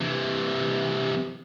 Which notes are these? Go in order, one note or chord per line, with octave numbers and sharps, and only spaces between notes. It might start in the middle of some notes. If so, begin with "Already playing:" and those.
C3 E3